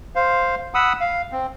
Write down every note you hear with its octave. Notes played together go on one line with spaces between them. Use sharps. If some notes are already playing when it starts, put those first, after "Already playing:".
C5 F5
F#5 B5 D#6 E6
F5
C4